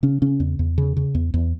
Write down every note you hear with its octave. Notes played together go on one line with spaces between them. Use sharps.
C#3 C#4
C#3 C#4
E2
E2
C#3
C#3
E2
E2